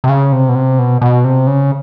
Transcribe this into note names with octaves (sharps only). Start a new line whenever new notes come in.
C3
C#3
C3
B2
C3
B2
B2
C3
C#3